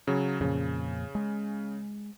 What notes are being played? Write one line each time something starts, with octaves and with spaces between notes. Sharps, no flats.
C#3 F#3
F2 A#2 C#3
G#3